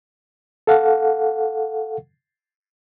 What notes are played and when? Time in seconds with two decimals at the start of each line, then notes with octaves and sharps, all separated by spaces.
0.67 A4 F5 F#5